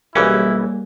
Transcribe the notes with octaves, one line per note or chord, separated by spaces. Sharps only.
B1 E3 G3 A#3 C#4 E4 G#4